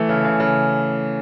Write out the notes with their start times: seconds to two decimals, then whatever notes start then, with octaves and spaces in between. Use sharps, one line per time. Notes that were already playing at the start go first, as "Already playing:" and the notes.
Already playing: E3 A3
0.09 C#3
0.24 C#3
0.40 C#3